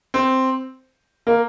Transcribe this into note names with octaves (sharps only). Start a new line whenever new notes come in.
C4
A#3